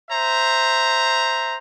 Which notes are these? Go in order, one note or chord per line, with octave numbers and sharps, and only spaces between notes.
C5 E5 A#5